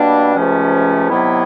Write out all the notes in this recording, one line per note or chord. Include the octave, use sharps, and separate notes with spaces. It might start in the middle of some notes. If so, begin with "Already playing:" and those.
Already playing: B2 G3 A#3 D4
C#2 C3 F3 A3 C#4
C3 D#3 F#3 B3 E4